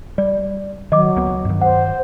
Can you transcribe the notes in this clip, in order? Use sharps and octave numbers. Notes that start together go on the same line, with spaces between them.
G3 D5
D#3 F#3 D#5 D6
C#2 A#3 B3
G2 D#3
C5 F#5